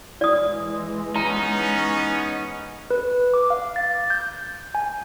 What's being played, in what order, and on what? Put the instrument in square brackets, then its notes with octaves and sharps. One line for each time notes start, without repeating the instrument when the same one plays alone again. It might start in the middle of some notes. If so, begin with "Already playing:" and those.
[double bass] E3 G#3 [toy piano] D5 D#6
[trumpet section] B3 C#4 [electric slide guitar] D#4 [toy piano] A#5
[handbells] B4
D6
F5
A6
G6
G#5